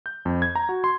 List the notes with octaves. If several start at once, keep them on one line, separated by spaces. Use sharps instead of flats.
G6
F2
G#6
A#5
F#4
C6